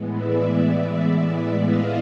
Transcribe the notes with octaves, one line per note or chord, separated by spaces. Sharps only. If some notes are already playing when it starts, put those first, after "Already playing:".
Already playing: A2 E3 G#3 B3
D5 E5
D#5 F5